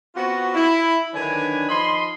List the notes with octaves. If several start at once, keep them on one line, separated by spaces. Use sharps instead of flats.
B3 C4 F4 F#4
E4
D3 D#3 F#3 D4 B4 G#5
F3 D#4 D#5 B5 C6